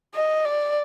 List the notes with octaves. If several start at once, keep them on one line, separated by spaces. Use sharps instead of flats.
D#5
D5